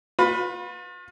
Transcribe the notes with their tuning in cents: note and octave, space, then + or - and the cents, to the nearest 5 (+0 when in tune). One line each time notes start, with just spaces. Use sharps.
F4 +40 B4 +0